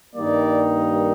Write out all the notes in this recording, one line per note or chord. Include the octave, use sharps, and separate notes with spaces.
G2 D#3 G3 A#3 D#4 D5